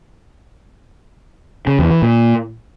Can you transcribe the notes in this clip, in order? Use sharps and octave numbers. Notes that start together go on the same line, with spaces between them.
C#3
E2
E3
A#2